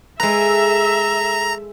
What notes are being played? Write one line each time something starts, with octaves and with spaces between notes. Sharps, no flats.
G#3 A4 B4 E5 A#5